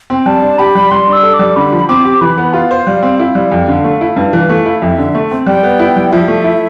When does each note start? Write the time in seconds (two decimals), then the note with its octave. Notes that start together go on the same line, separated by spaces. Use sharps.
0.10 C4 G5
0.26 G3 A5
0.42 D4
0.58 G4 B5
0.75 G3
0.91 G3 C6
1.07 D4
1.13 E6
1.23 A4
1.34 D6
1.39 G3
1.56 D3 B5
1.72 F3
1.88 C4 D6
2.04 G4
2.21 E3 B5
2.38 B3
2.53 F4 F5
2.71 C5
2.86 G3 F5
3.03 C4
3.19 E4 F5
3.35 G3
3.52 F2
3.68 D3
3.84 A3
4.01 E4
4.16 G2
4.33 E3
4.49 A3
4.66 E4
4.82 F2 E5
4.98 D3
5.15 A3
5.31 C4
5.46 G3 G5
5.63 B3
5.79 E4
5.96 G3
6.12 F3 E5
6.28 A3
6.44 E4